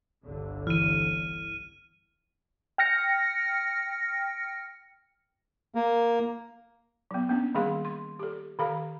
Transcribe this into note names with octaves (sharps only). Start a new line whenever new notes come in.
G1 C2 D3
E3 F6 D#7
G5 F6 A#6 C#7
A#3
F#3 B3
A#3 B3 C#4 D4
D#3 G3 A#3 G#4 F5 C6
C6
G4 A4
D#3 G4 A4 F5 A#5